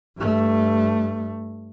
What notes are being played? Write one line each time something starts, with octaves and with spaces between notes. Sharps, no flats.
G2 A3